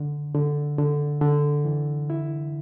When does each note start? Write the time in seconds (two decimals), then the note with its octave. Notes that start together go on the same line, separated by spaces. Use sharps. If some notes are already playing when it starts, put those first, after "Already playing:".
Already playing: D3
0.34 D3
0.78 D3
1.21 D3
1.65 E3
2.10 E4